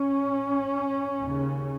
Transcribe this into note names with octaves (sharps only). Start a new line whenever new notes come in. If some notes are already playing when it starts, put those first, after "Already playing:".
Already playing: C#4
D#2 C#3